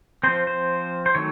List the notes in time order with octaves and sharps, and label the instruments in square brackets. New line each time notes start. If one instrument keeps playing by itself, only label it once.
[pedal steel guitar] F3 C4 C5
C5
C5
D#3 F#3 A3 C#5